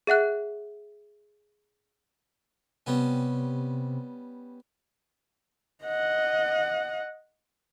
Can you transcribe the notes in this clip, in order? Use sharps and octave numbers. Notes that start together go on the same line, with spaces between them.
G#4 E5 F#5 F#6
C3 G3 B3 C#4
D#5 F#5